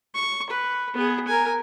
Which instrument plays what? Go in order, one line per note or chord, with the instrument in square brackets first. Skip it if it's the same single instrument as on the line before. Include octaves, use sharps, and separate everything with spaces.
[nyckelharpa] C#6
B4
B3 G#4
A#4 G#5